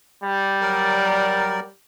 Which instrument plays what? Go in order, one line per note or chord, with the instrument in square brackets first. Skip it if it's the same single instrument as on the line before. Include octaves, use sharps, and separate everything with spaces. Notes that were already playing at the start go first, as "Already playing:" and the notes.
[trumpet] G3
[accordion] F#3 A#4 D5